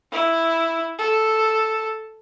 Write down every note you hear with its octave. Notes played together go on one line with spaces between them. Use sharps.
E4
A4